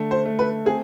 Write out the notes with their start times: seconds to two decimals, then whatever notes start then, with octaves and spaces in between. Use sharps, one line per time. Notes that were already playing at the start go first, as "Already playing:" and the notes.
Already playing: D3 A3
0.11 C5
0.25 A3
0.39 B4
0.66 C4 G#4